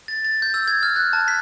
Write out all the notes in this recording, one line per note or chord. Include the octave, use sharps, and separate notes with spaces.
A6
A6
G6
E6
G#6
F6
F#6
A5
B6